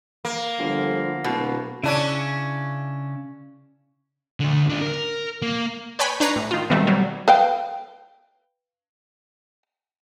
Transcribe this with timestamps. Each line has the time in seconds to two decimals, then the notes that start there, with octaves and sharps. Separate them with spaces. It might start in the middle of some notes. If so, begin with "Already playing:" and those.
0.25 A#3
0.59 G1 D3 F3
1.24 D1 B2
1.84 C#3 C#4 D4 E4
4.40 D2 D3
4.70 D4 F4
4.82 A#4
5.42 A#3
5.99 B4 C#5 G5 G#5 B5
6.20 D4 B4 C#5 A#5 C7
6.36 A2
6.51 D#3 F4
6.70 B2 D#3 G3 A3 C4
6.87 F#3 G3
7.28 B4 F5 G5